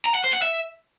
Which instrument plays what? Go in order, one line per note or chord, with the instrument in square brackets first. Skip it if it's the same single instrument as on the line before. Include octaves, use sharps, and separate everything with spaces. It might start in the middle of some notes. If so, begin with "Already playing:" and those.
[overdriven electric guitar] A#5
F#5
C5
F#5
E5